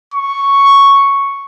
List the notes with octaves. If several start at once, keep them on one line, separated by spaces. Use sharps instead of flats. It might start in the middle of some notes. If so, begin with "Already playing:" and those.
C#6